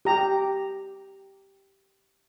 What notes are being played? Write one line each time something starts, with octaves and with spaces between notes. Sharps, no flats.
G4 A#5